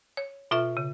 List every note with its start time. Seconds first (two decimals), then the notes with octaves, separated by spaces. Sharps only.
0.17 C#5
0.51 B2 F4 A4 E5 C#6 F6
0.77 C#3